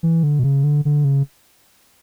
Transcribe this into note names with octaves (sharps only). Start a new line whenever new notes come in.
E3
D3
B2
C#3
D3
D3
C#3